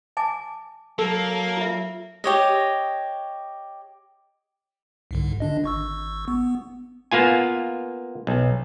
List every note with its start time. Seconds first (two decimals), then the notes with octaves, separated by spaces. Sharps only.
0.17 G#5 A5 D6
0.99 F#3 A#3 A4
1.57 F4 E5
2.24 G4 C#5 D#5
5.11 C2 G#2 D3
5.40 D3 D4 D#5
5.64 G#1 C#6 E6
6.28 B3
7.11 A#3 B3 F4 G#5
8.27 B1